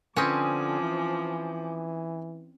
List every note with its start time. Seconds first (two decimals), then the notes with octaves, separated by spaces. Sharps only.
0.16 D3 F3 C4 C#4 B4 G#5 D6 D#6
0.82 E3